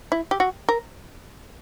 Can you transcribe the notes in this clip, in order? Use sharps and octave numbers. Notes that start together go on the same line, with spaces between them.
E4
G4
F#4
A#4